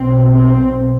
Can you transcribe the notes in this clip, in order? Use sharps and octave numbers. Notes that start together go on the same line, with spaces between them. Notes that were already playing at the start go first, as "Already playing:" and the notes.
Already playing: B1 B2 C4
C4